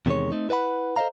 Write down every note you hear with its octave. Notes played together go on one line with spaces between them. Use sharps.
E2 C3 D#3 E3 G#3 C#5
A3 C4 D#4
E4 B4 D5 F#5 B5
A4 C5 D5 D#5 F5 A#5